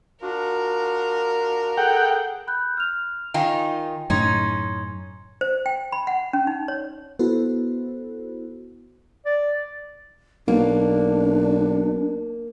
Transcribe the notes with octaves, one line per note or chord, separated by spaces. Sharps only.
D4 F4 F#4 A#4
G#4 A4 F#5 G5
B5 F#6 G6
F6 F7
D#3 D#4 F4 G5 G#5
F#2 A2 C#3 C#4 D#4 C6 G#6
C5
G5
B5
F#5
C#4
D#4
C#5
B3 E4 F#4 A4 C5
D5
B1 A#3 D4